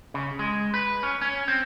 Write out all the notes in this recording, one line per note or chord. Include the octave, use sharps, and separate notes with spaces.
C#3
G#3
B4
C#4
C#4
C4